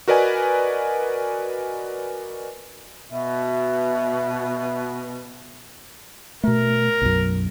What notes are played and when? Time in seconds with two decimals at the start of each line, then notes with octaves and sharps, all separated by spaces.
0.08 F#4 A#4 B4 D5 D#5 G#5
3.12 B2 E5
6.44 B2 A3 A#4
7.02 B1 F#2